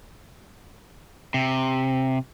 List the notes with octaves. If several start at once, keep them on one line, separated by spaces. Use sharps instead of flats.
C3